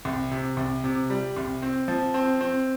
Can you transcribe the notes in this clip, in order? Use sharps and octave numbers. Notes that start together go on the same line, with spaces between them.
C2
C3
C2
C3
G3
C2
C4
F3
C4
C4